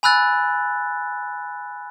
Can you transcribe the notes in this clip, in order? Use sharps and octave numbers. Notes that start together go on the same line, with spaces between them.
G#5 B5 E6 F#6 A6